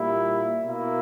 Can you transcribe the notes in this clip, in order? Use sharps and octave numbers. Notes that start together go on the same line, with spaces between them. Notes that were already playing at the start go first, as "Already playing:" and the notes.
Already playing: A#2 G3 A#3 E4
B2 A#3 E4